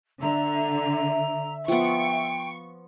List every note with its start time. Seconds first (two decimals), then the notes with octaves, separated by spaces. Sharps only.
0.21 D3 E5 A#5
1.68 F3 B3 G5 C#6